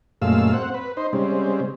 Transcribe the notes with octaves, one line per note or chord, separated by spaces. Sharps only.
F#2 A#2 G#3 A3 F5 E6
C4 F#5
B4
D#4 C5
C#3 G3 G#3 C4